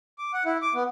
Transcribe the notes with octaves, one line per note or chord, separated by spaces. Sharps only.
D6
F#5
E4
D6
B3